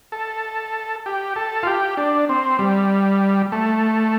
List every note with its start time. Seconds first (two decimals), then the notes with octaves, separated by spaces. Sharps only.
0.12 A4
1.06 G4
1.36 A4
1.63 F4
1.67 G4
1.97 D4
2.29 C4
2.59 G3
3.52 A3